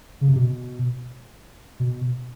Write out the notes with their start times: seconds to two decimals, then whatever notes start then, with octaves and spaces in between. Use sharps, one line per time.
0.21 C#3
0.28 C3
0.36 B2
1.80 B2